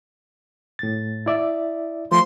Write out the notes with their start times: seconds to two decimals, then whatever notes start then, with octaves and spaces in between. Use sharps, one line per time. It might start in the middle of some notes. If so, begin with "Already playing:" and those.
0.79 A2 A6
1.26 E4 D5 E5
2.12 F3 A3 C6